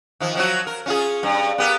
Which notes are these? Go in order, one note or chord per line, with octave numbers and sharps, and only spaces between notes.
D#3 F3
F3 F#3 F#4
A#4
C#4 F4 G#4
G2
B3 G4 A#4